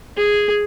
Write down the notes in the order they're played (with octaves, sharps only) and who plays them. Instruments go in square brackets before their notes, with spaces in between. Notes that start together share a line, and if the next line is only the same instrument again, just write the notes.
[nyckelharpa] G#4